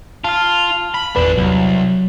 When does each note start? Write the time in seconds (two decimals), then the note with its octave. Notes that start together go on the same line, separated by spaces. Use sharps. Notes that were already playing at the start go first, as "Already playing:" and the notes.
0.24 F4 A5 F6
0.94 B5
1.16 G#1 E2 A#2 D4 B4
1.38 C2 F#3